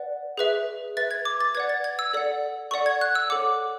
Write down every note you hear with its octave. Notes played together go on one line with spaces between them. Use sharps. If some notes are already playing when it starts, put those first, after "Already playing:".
Already playing: B4 D5 F#5
G#4 B4 E5
B4 E5 A6
G#6
D6
A6
B4 D5 F#5 G#6
A6
G#6
E6
A4 D5 F#5
A4 D5 F#5 C#6
G#6
F#6
E6
A4 C#5 F#5 D6